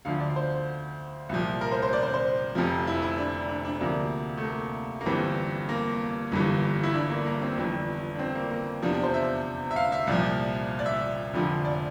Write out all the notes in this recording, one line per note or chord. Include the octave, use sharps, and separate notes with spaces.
D2 D3 F3 F5
D5
C5
C2 A#2 F3
A#4
C5
C5
D5
C5
C5
F1 F2 C3 F3
E4
E4
D4
D4
D4
D2 C3 F3 A#3
A3
A#3
A#3
G1 G2 E3 C4
A#3
G1 G2 E3
E4
D4
A#3
A#3
C4
G1 F2 E3 D4
D4
C4
A#3
A#3
E2 C3 F3 D4
D4
C5
E5
E5
F5
E5
C2 A#2 F3 D5
D5
E5
F1 F2 D3 F3
D5